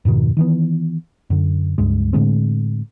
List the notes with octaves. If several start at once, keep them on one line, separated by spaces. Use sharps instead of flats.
F2 G#2 B2 D#3
D#3 E3 B3
F#2 D3
C#2 G2 G#3
A2 D3 G#3 C4